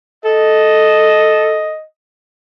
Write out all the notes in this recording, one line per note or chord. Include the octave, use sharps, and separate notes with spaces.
A4 D#5